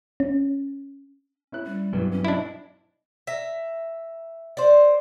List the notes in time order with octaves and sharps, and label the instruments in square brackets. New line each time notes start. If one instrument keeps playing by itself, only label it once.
[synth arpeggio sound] C#4
[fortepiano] C#4 E4 F#6
[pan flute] G3
[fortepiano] G2 E3 [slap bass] B2 F#3
[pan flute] C#4
[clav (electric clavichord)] D4 E4 [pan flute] D#5
[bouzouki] E5 A#5
C5 D5